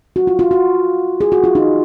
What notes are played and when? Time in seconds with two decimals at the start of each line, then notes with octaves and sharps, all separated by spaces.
0.16 F#4
0.27 F4
0.39 F4
0.51 F#4
1.21 G#4
1.32 F#4
1.44 F4
1.55 D#4